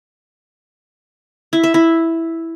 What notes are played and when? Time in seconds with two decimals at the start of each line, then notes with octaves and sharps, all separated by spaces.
1.53 E4
1.63 E5
1.74 E4